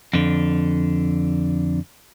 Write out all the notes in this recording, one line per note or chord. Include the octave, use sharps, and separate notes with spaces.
F2 D3